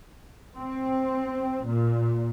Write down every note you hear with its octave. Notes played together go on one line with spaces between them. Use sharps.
C4
A#2